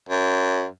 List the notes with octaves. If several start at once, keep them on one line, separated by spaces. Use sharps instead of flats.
F#2